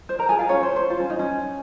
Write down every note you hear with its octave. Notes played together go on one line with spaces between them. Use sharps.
C5
A#4 A#5
G#4 G#5
F4 F5
C#4 C#5
C5
C5
F4
C#4
D#4
C#4